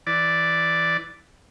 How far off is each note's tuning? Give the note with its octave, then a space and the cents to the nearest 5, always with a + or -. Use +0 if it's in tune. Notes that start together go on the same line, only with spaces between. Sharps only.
E3 +0 D5 +0